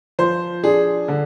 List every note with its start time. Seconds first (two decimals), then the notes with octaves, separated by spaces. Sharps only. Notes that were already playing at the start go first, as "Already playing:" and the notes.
0.19 F3 C5
0.63 D4 G#4
1.08 D3